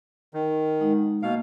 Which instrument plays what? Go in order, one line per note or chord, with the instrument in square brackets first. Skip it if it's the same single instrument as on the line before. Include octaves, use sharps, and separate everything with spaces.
[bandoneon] D#3
[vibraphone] G#3 D#4 F#5
[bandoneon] B2 F5 [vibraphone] A#3 D#5